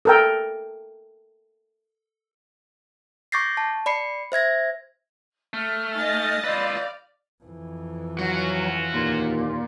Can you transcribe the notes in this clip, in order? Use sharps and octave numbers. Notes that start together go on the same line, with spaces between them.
A4 A#4 G5
C#6 D6 G6 A6 A#6 C7
A5
D5 B5 C7 C#7
C5 E5 G#6 A#6
A3 F6
D#4 D#5 G#5 A6
F4 B4 D5 F5 B5 E6 G6
F2 E3
F#3 C#4 F4 F#4
D#2 A#2